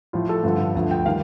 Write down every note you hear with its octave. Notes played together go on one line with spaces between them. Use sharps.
A2 F3 F4
A4
G2 D3 F3
D2 D3 F3
G5
D#3 G3 F5